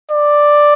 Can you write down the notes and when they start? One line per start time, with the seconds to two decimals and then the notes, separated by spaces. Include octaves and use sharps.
0.11 D5